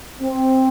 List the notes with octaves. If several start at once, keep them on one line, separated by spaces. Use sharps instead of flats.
C4